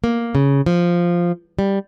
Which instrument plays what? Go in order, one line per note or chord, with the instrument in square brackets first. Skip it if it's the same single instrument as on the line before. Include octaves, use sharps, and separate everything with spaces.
[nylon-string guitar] A#3
C#3
F3
G3